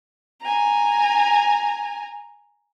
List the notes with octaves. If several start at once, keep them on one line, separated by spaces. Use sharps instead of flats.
G#5 A#5